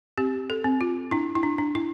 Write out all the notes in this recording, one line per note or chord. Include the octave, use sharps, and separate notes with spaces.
C4 G4
A4
C4
F4
D4 E4
E4
D4
D4
E4